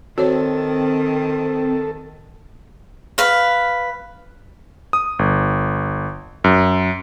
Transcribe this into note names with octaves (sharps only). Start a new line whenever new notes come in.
D#3 C4 F#4 A4 C#5
B4 F5
D#6
G1
F#2